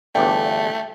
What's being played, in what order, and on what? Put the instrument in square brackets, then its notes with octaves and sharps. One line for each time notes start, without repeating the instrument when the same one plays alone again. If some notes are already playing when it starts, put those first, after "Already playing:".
[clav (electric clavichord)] G1 E2 D4 [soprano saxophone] A3 [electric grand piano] G5